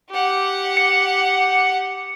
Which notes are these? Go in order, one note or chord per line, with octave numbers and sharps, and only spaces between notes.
G4 F#5
C#7